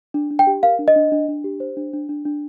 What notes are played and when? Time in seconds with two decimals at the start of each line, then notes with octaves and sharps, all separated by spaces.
0.14 D4
0.30 D4
0.39 G5
0.47 G4
0.63 A#4 F5
0.79 D4
0.88 D#5
0.96 D4
1.12 D4
1.29 D4
1.44 G4
1.60 C5
1.77 D4
1.93 D4
2.09 D4
2.25 D4